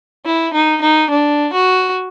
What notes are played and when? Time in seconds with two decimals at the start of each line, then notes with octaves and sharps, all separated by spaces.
0.25 E4
0.53 D#4
0.81 D#4
1.10 D4
1.52 F#4